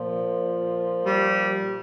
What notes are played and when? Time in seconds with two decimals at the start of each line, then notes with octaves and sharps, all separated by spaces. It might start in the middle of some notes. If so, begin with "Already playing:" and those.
Already playing: A#2 F3
1.05 G3